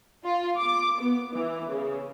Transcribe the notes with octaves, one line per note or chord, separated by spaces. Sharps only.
F4
D6
B3
E3
C#3